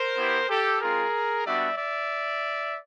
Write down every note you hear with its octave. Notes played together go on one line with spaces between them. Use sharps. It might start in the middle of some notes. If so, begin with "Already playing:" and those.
Already playing: A#4 C5
B3 E4 G4
G4 A4
G#3 C4 F4 G#4 A#4
G3 B3 D4 F#4 D5 E5
D5 E5